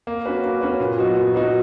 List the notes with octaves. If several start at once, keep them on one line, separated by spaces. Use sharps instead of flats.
A#3
C#4 F#4 B4
A#3
C#4 F#4 B4
A#2
F#3 B3 D#4 F#4
A#2
F#3 B3 D#4 F#4